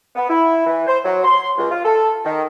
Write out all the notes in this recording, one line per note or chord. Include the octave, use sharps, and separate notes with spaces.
B3
E4
E3
C5
F#3
C6
C#2
F4
A4
D#3